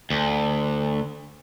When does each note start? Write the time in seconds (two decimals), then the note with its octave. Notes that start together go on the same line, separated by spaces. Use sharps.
0.10 D2